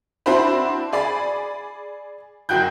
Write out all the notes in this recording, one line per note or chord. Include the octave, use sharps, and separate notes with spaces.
C4 D4 E4 F#4 C5 B5
G#4 D5 B5
F#1 F#4 G5 F#6 G6